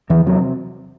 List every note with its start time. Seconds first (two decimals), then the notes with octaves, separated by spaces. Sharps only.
0.10 E2 E3
0.26 C3 F#3